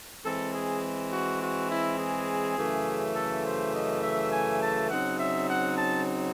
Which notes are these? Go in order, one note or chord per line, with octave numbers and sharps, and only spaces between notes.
E3 G#3 C4 A4
G#4
F#4
F#4
E4
G#4
F#2 C#3 E3 A3
A4
C5
D#5
E5
G#5
A5
C#3 F#3 C4 D#4 F#5
E5
F#5
A5